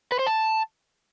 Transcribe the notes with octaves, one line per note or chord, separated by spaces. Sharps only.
B4
C5
A5